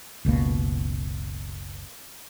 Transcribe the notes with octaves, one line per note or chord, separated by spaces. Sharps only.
F#1 C#2 B2 A#3